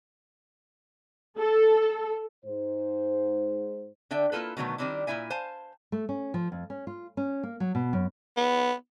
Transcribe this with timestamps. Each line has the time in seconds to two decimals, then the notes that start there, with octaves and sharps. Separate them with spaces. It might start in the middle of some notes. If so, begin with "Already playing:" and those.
1.38 A4
2.44 G#2 C5
4.11 D3 D4 E5 G5
4.32 A#3 E4 F4 A4 B4
4.57 B2 D3 D#3 F#3 A3 B3
4.78 D#3 G3 C4 D4 E4
5.07 A#2 A#3 E4 E5 G#5
5.30 C5 F5 G#5 A5
5.92 A3
6.09 C#4
6.34 F3
6.52 F2
6.70 C#4
6.87 F4
7.17 C#4
7.43 A#3
7.60 F#3
7.75 B2
7.93 F#2
8.37 B3